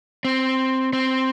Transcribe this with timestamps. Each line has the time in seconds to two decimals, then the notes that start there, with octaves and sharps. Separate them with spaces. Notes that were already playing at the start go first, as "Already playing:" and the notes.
0.25 C4
0.93 C4